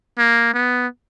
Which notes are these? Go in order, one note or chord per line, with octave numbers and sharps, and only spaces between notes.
A#3
B3